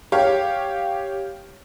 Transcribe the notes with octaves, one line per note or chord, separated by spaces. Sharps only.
G4 C#5 F5